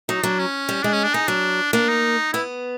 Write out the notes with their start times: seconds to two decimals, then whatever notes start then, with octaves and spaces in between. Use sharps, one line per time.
0.09 F#3 D#4
0.23 F#3 D4
0.39 C#4
0.69 G3
0.83 G#3 D4
0.93 C#4
1.03 D4
1.14 G#3 D#4
1.28 F#3 D4
1.73 A#3 D4
1.89 D#4
2.33 B3 E4